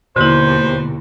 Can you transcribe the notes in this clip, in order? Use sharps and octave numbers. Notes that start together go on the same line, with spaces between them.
D#2 B2 D3 E4 B4 C5